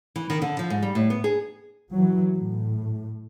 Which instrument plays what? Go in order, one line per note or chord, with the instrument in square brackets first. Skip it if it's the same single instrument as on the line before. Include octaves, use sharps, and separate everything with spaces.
[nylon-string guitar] E3
D#3
D3
F3
G#2
G3
A2
B3
G#4
[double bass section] E3 F#3
A2